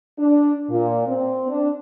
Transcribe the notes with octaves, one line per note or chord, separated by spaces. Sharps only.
D4
A#2
C4
D4